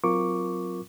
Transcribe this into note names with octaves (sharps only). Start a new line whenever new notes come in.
F#3 C4 F4 A#4 C#6 D6